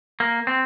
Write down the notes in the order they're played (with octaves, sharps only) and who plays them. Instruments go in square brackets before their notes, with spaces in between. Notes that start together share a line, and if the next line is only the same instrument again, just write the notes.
[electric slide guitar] A#3
C4